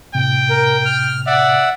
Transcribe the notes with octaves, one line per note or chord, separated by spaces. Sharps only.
A2 C3 G5
A#4
F6
D5 E5 F#5